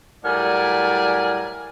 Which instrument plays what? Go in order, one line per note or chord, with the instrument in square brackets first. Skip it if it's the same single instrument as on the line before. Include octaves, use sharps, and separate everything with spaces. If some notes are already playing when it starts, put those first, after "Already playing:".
[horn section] A2 F#3 G3 A#4 D5 G#5